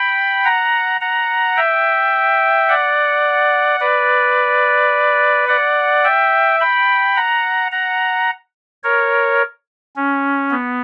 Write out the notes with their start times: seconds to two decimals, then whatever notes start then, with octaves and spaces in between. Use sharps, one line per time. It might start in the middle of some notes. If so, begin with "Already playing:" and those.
Already playing: G5 B5
0.44 F#5 A#5
1.01 F#5 A#5
1.56 E5 G5
2.69 D5 F#5
3.80 B4 D5
5.48 D5 F#5
6.04 E5 G5
6.60 G5 B5
7.16 F#5 A#5
7.72 F#5 A#5
8.83 A#4 C#5
9.96 C#4
10.51 B3